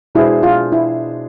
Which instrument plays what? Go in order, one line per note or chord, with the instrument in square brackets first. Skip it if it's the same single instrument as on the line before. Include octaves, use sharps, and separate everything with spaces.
[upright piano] B2 G#3 D4 G#4 C5 [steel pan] E4
[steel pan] F4
E4